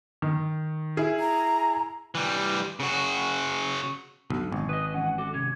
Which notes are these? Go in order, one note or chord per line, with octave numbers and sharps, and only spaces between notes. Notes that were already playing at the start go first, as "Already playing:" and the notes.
D#3
E4 G#4
A#5
E3 G3
C#3 F#4
B1 G#2 B2 D3
G#1
B4 D#5 D#6
E3 C#4 F#5
F#4 A4 D6
C3 C#4 G#6